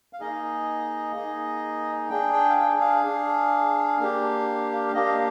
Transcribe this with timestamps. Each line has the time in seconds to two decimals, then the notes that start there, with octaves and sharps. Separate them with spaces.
0.13 F5
0.20 A#3 D#4 G#4 D#5
1.15 A#3 D#4 G#4
2.10 D4 G#4 G5
2.33 G5
2.50 F5
2.57 G5
2.81 F5
3.04 D4 G#4
3.99 A#3 D4 G4
4.88 F5
4.94 A#3 D4 G4 D#5
5.06 F5